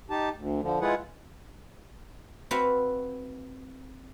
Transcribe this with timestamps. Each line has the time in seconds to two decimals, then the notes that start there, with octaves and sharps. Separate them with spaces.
0.10 D#4 G4 A5
0.36 D2
0.61 D3 F3
0.81 G#3 E4 F4 G#4 B4 F#5
2.51 C4 F#4 B4 E5 F5